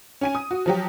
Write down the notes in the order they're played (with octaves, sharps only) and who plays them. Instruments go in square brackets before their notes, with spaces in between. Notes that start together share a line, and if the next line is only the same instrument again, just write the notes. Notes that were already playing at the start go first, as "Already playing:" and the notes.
[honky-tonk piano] C#4 G#5 D#7
D#6
F#4
F3 F#3 G4